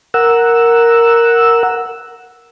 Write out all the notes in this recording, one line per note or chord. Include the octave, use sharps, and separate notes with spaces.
A#4 F#5 E6